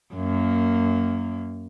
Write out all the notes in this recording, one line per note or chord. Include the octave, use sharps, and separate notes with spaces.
F#2 A#3